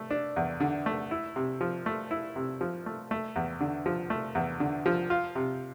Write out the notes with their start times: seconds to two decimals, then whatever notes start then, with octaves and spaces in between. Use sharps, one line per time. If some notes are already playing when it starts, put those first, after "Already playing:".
Already playing: A3
0.10 D4
0.36 E2
0.60 D3
0.86 A3
1.11 E4
1.36 C3
1.61 F3
1.86 A3
2.11 E4
2.36 C3
2.61 F3
2.86 A3
3.11 A3
3.36 E2
3.60 D3
3.86 F3
4.10 A3
4.35 E2
4.60 D3
4.86 F3
5.10 F4
5.35 C3